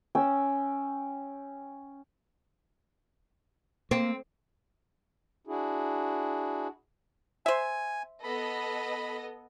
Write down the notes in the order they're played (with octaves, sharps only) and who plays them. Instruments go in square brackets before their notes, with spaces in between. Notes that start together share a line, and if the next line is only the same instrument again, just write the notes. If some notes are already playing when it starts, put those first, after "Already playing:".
[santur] C#4 G5 E6
[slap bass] A#3 [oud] C4
[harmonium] D4 E4 F#4 G#4
[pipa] C5 E5 [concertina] G#5
[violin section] B3 A4 D#5 [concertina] B5